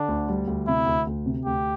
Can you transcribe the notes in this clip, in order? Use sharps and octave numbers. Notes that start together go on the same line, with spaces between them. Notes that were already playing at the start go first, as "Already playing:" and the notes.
Already playing: D3 D4
D2
G3
D2
C3 E4
D2
D2
C3
D2 G4